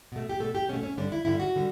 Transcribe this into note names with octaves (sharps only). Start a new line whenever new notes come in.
B2 A3
G4
B2 A3 A4
G4
B2 A3 C#4
C#4
G2 D3 G3 D4
E4
G2 D3 G3 E4
F#4
D3 G3